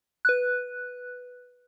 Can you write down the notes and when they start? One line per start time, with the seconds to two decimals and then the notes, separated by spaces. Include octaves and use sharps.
0.25 B4 F#6